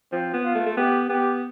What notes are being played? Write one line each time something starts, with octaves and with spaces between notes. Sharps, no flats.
F3 C4
B3
F4
A3
A3
B3 G4
B3 G4